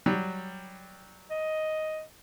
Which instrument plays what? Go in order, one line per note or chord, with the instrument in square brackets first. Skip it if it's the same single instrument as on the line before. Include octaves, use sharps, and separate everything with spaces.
[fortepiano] F#3 G3
[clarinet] D#5